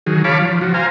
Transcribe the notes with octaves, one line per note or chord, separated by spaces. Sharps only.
D#3 F#3 G#4
C#5 F5 A5 B5 D6
F3
F3 F#4
C5 F5 G#5 A#5